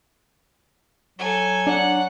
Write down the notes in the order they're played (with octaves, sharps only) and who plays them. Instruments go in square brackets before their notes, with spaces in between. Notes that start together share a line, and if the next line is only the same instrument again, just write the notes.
[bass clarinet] F#3 [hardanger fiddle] A4 G#5
[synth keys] D4 [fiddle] F#5